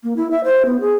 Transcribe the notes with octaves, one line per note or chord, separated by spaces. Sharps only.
A#3
E4
E5
C5
B3
G#4